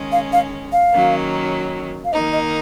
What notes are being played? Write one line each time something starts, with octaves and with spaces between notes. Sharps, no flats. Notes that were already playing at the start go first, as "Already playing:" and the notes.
Already playing: D#3 G#3 C#4
F5
F5
F5
D#3 F#3 A#3 C#4
F5
D#3 A#3 D#4 D#5
D#5